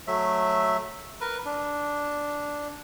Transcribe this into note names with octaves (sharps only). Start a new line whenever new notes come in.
F#3 A3 E5
A#4 B4
D4